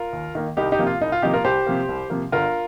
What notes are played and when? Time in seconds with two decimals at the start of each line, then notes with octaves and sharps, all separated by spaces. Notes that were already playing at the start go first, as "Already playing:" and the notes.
Already playing: F4 A#4
0.13 D#2
0.35 D#3 A#3
0.57 C2 D#4 G4
0.72 D#4 G4
0.79 C3 F3 A#3
0.87 F4
1.01 C2 D#4
1.12 F4
1.22 C3 F3 A#3 D#4 G4
1.34 F4 A#4
1.44 C2 G4 C5
1.66 C3 F3 A#3
1.89 C2
2.10 C3 F3 A#3
2.32 G1 F4 A#4